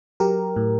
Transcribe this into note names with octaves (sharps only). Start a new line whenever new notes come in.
F#3 G4 A#4
A2